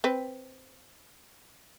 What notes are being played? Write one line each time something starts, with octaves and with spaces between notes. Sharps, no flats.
C4 B4